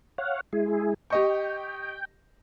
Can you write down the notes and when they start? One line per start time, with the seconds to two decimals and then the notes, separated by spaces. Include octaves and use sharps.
0.18 C#5 F5 F#5
0.53 G#3 E4 G#4
1.10 G4 D#5 G5 C#6